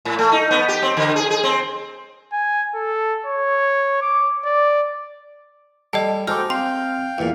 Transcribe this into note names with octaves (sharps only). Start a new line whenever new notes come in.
A2
A3
D#4
B3
G4
C4
D3
G#4
G#4
C4
G#5
A4
C#5
D6
D5
G3 A4 D#5 G5 A5
G#3 D#4 F#4 A4 C5 G5 D6 F6
C4 F5 G5 C6 C7
E2 A#2